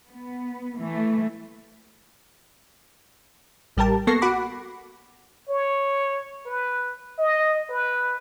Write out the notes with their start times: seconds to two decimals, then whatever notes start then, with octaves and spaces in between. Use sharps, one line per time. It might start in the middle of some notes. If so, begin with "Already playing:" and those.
0.10 B3
0.77 E3 A3
3.77 A1 G3 G4 A#4 A5
4.07 A#3 B3 A4 C#6 A#6 C7
4.22 F#4 F#5 B5 D6
5.49 C#5
6.46 B4
7.18 D#5
7.70 B4